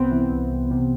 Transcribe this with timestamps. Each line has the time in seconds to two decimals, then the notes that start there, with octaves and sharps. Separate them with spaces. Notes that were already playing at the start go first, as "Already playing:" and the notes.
Already playing: C2 C3 B3 C4
0.11 E3
0.32 C2
0.51 C2
0.71 C3